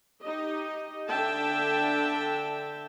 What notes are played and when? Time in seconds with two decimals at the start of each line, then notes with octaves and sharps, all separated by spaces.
0.22 D#4 G4 D#5
1.07 D3 D4 E5 G5 A5